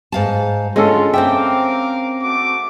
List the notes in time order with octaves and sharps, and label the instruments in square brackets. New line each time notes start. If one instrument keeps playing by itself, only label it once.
[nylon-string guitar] G#2 F5 A5
[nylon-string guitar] D3 [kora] G#3 C#4 A4 [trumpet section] F4
[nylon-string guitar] C4 C5 G5 [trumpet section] A#4 F5 D6 [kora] E5
[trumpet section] A3 F#4 D6